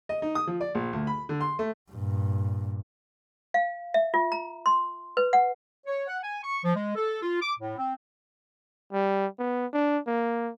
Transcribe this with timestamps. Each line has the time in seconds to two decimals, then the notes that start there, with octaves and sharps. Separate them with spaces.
0.09 D#5
0.22 D#4
0.35 D#6
0.47 F3
0.61 D5
0.75 A#1
0.93 D2
1.07 B5
1.29 D3
1.41 C6
1.59 A3
1.91 G2 A#2
3.54 F5
3.94 E5
4.14 F4
4.32 A#5
4.66 C6
5.17 B4
5.33 F#5
5.86 C#5
6.08 F#5
6.23 G#5
6.43 C#6
6.64 F3
6.75 G#3
6.95 A4
7.22 F4
7.41 D6
7.59 A2
7.77 C4
8.92 G3
9.39 B3
9.73 D4
10.07 A#3